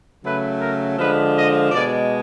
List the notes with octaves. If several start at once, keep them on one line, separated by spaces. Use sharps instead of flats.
C#3 F#3 A3 B4
A#4
D3 F3 G#3 B4
D#5
B2 G#3 D5